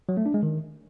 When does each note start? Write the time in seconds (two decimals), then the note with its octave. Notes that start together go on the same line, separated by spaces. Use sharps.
0.09 F#3
0.17 A3
0.26 D4
0.34 G#3
0.43 D#3